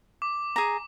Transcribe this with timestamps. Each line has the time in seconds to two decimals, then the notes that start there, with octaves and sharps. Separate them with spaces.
0.22 D6
0.56 G#4 A#5